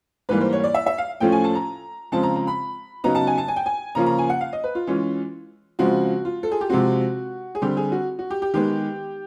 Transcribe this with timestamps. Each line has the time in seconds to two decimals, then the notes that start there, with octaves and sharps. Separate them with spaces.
0.29 G#2 E3 G3 A#3 B4
0.41 C5
0.52 C#5
0.64 D5
0.74 E5
0.86 E5
0.98 F5
1.20 A2 F3 A3 C#4 F4 G5
1.32 G#5
1.44 A5
1.55 A#5
2.12 C#3 F3 G#3 C4 A5
2.23 A#5
2.36 A#5
2.47 B5
3.04 C#3 F#3 B3 D#4 A#5
3.15 A5
3.27 G#5
3.38 A5
3.48 G#5
3.56 G5
3.66 G#5
3.95 C#3 F3 A#3 C#4 F4 A#5
4.06 A#5
4.18 G#5
4.30 F#5
4.41 F5
4.53 D#5
4.64 B4
4.75 F4
4.87 E3 G#3 C#4 F4
5.79 C#3 F3 G#3 C4 F#4
6.25 F4
6.43 A4
6.52 G#4
6.61 G4
6.70 C3 F3 G#3 C4 F#4
7.55 G#4
7.62 D3 G3 C4 G4
7.77 G#4
7.92 F#4
8.19 F#4
8.30 G4
8.42 G4
8.54 D#3 G#3 B3 G4